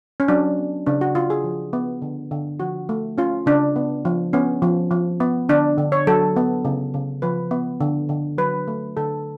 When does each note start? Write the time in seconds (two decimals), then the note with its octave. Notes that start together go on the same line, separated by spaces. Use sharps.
0.20 C#4
0.28 F#3 D4
0.58 B3
0.86 C#3 D4
1.01 F#4
1.15 C#3 F4
1.30 G#4
1.44 F3
1.73 B3
2.02 D3
2.31 D3
2.60 F3 F#4
2.89 A3
3.18 C#4 F4
3.46 C#3 D4
3.76 B3
4.05 F3
4.33 B3 C#4
4.62 F3
4.91 F3
5.20 B3
5.49 D3 D4
5.78 D3
5.92 C#5
6.07 F#3 A4
6.36 B3
6.65 C#3
6.94 C#3
7.22 F3 B4
7.51 B3
7.81 D3
8.09 D3
8.38 F#3 B4
8.68 A3
8.97 D3 A4